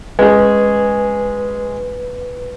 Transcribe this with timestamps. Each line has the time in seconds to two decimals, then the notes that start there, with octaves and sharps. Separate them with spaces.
0.19 G#3 C#4 G#4 B4